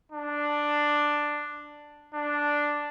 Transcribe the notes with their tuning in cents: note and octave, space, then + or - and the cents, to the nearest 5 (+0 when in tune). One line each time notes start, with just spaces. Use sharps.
D4 +5
D4 +0